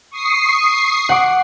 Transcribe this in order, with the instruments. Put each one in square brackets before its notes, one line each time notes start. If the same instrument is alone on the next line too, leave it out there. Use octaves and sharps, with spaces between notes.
[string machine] C#6 D#6 C7
[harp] F#5 D6